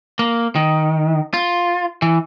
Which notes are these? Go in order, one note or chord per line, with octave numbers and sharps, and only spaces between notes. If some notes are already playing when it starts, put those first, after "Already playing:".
A#3
D#3
F4
E3